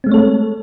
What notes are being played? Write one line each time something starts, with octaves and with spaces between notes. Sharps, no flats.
G#3 A3 C4 A4 C#5